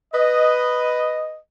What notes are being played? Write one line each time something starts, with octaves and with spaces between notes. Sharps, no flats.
B4 D#5